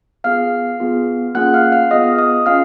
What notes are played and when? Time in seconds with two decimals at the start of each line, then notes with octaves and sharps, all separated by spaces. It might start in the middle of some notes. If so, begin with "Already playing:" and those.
0.24 B3 F4 G#4 F5 F6
0.80 B3 F4 G#4
1.35 A#3 C#4 F4 G#4 F#5 F#6
1.54 F5 F6
1.72 F5 F6
1.91 B3 F4 G#4 D#5 D#6
2.18 D#5 D#6
2.46 C#4 F4 G#4 F5 F6